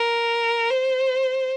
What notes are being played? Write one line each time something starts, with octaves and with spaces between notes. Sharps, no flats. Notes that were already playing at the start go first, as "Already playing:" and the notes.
Already playing: A#4
C5